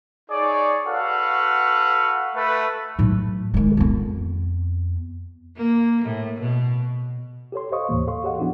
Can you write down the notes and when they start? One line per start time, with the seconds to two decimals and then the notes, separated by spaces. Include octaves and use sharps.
0.31 D#4 G#4 C#5 D5
0.86 F#4 A4 B4 F5 F#5
2.36 A3 A4 B4
2.99 A2 F#3
3.54 D#3 G#3
3.77 F2 B3
5.56 A#3
6.05 A2
6.41 B2
7.52 G4 A4 C#5 C6
7.72 C5 C#5 D#5 F5 C#6 D#6
7.89 D#2 A2 E3 A#3
8.07 A4 F5 C6 C#6
8.24 G4 G#4 C#5 D#5 F5 F#5
8.39 F3 B3 D4 E4 F#4 G4